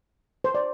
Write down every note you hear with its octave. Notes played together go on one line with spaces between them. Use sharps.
C5
D5